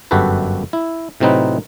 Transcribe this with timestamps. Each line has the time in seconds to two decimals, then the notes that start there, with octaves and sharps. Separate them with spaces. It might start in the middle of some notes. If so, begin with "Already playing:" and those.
0.11 G1 F#2 F#4 G4 A4 B4
0.73 E4
1.20 A2 C3 F#3 C4 D#4 B4